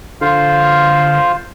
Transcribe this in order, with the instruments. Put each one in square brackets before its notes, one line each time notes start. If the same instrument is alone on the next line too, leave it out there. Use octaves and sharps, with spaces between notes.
[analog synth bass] D3 [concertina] F4 C5 F5